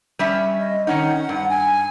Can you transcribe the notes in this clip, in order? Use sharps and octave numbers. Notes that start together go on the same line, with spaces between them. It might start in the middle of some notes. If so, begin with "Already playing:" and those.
G3 C#4 E5
D#5
D#3 C#4 D#4 F#5
G2
G#5